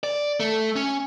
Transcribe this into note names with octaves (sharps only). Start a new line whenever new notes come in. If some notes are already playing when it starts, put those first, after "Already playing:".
D5
A3
C#4